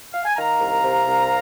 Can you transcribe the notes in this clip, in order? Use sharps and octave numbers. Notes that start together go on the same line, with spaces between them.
F5
G#5
D#3 F5 A#5
C2
C3
C2